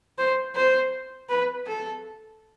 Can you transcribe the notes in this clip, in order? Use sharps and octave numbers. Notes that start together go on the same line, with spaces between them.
C5
C5
B4
A4